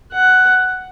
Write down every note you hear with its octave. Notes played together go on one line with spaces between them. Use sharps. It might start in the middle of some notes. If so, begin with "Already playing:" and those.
F#5